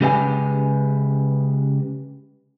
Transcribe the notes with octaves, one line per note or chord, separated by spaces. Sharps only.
C#3 G#3 G4 B4 D#5 G#5